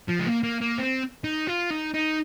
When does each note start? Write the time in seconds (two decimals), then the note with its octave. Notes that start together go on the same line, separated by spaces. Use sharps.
0.09 F3
0.20 G#3
0.27 A#3
0.43 A#3
0.61 A#3
0.78 C4
1.24 D#4
1.47 F4
1.70 D#4
1.94 D#4